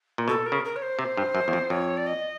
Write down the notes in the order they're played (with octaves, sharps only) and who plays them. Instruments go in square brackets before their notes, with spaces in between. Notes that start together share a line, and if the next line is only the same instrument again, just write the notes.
[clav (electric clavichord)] A#2
[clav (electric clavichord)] B2 [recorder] A4
[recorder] A#4
[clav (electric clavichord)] C#3
[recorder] A#4
C#5
C5
[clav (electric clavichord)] C3
G2
F#2
E2
F2
[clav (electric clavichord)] F2 [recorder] C#5
[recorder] D5
D#5